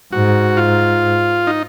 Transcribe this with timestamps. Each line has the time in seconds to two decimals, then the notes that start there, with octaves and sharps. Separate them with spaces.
0.12 G#2 F#4
0.57 F4
1.47 D#4